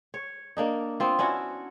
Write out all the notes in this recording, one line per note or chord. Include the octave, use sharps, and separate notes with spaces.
C#5
A#3 D4 D#4
B3 C4 F4
C#4 D4 E4 F#4